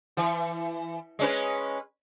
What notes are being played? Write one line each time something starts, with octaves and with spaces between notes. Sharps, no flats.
E3
G#3 C#4 B4